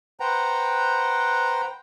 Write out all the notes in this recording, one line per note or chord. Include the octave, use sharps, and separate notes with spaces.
B4 C5 F#5 G5 A#5